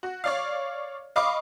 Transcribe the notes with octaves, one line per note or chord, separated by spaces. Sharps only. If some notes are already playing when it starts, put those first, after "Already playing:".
F#4
C#5 D5 F5
D#5 F5 B5 C#6 D6